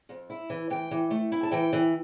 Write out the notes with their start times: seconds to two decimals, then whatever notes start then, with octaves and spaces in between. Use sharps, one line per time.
0.09 F2
0.30 E4
0.50 E3
0.70 E3 G5
0.91 E3
1.10 A3
1.32 E4
1.43 A5
1.51 E3 G5
1.73 E3